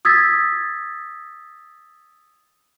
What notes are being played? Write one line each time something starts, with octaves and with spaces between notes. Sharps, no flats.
D#6 E6 G#6 A6 B6